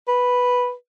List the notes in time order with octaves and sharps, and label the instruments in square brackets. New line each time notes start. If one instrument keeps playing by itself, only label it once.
[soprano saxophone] B4